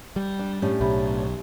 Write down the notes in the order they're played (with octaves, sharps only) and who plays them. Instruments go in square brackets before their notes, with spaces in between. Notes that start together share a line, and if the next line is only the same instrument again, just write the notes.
[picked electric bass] G3
[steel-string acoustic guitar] D4
[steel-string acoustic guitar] A2 C#4 D4 [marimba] G4
[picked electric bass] B1 [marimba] G4 E5 B5